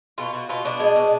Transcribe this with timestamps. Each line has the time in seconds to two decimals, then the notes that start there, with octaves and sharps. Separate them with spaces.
0.18 B2 F4
0.33 B2 F#4
0.49 B2 F4
0.65 B2 D4
0.80 G#3
0.96 B2